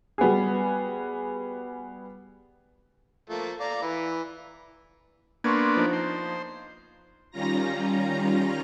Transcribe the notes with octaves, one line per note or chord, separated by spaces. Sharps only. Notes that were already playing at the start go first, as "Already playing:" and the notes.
G3 B3 F#4 G#4
F3 A3 A#3
D5 F5 A#5
E3
A#3 B3 D4 C6 C#6 G#6
F3 D#4
C5
D#3 G3 C#4 F4 A#5 A#6